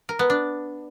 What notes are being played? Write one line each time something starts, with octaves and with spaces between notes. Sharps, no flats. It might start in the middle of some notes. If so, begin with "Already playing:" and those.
A#4
B3
D4